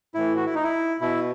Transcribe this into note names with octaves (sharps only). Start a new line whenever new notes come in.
A2 E3 E4
F#4
E4
D#4
E4
B2 E4